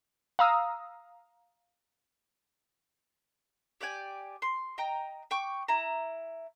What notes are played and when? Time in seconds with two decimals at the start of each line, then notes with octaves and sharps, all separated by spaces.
0.39 F5 A#5 D#6 E6
3.81 G4 D5 G5 G#5
4.42 C6
4.78 D#5 G5 A#5
5.31 G5 C#6 D6
5.68 E4 A#5